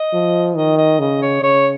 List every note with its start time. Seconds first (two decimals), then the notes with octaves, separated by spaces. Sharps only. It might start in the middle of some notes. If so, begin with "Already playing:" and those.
Already playing: D#5
0.14 F3
0.57 D#3 D#5
0.77 D#5
1.00 C#3 D#5
1.22 C#5
1.43 C#3 C#5